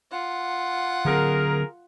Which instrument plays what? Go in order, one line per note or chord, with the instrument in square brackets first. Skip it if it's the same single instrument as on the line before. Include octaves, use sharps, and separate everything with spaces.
[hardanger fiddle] F4 F#5
[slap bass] D3 F#3 C4 [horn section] G#4 A#4